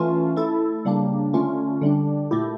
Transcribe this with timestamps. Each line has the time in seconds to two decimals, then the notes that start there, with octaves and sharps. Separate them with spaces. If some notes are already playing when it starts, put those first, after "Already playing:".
Already playing: E3 A3 C#4 F4
0.36 A3 E4 A4
0.85 C#3 G3 A#3 D4
1.33 D3 A3 C#4 F4
1.81 D3 G3 D4
2.31 A#2 A3 E4 G4